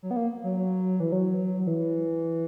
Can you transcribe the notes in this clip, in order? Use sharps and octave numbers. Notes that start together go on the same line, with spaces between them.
F#3
B3
A#3
F#3
F#3
E3
F#3
F#3
E3